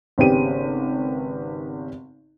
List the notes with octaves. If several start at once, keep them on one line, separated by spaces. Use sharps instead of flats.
G#1 C#3 B3 G4 D#7